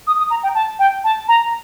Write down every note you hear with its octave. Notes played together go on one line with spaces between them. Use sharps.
D#6
D#6
A#5
G5
A5
G5
A5
A#5